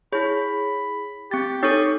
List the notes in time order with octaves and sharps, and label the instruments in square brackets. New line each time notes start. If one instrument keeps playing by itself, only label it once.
[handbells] E4 G#4 [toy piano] C#5 [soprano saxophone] B5
[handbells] C4 A6 [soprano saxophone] G4
[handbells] D#4 A4 [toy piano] C#5 D#6 [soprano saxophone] C#6